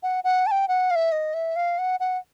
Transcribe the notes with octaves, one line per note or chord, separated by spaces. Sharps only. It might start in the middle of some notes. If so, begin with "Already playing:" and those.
F#5
F#5
A5
G5
F#5
F5
E5
D#5
E5
F5
F#5
F#5